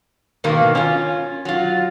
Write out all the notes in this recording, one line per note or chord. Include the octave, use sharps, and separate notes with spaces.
G#2 B2 D#3 A#3
C#4 F4
F#3 F4